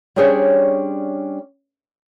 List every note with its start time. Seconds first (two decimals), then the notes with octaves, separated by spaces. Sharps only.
0.16 G3 C#4 D4 G#4 C5 C#5